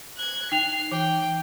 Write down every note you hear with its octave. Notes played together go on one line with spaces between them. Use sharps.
F#6 G#6
D#4 G5 C7 F7
E3 G5